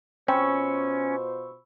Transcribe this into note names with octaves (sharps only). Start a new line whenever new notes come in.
B2 C4 C#4 F4 C5 B5 C#6 E6